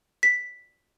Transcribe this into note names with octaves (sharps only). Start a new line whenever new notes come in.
B6